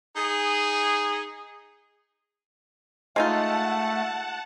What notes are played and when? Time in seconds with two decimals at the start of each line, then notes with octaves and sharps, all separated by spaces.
0.16 D#4 G#4
3.16 G#3 A3 D#4 F4 F#5 A5